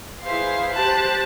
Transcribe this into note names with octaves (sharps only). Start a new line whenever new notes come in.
E4 G#4 B4 C5 F5 C6
G4 C5 A5 F#6